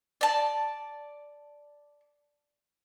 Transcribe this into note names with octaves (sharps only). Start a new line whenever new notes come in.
D5 A5